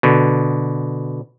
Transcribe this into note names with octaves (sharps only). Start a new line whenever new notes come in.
B2 D3